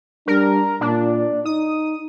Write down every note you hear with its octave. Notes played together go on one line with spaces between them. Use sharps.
G3 D4 A#4
A#2 D4
D#4 D#6